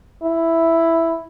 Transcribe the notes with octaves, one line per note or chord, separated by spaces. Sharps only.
E4